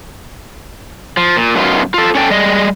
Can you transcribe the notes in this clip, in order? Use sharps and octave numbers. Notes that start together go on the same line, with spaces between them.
F3
A#2
F#2 B2 D#3 F4
F4 A4
C#4 D4 A4 G5
G3 G#3 D#5